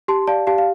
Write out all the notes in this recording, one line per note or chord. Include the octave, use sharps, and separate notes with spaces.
G4 A5 C6
D5 F5 A5
G4 F5 A5
F5